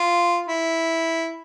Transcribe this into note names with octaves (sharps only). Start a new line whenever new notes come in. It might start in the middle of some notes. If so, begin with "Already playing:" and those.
Already playing: F4
E4